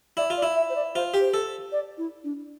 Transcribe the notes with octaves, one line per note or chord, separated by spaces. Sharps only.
E4 D5
F4
D5
E4
E5
C5
D5
F4 C5
G4
C5
A4
D5
E4
D4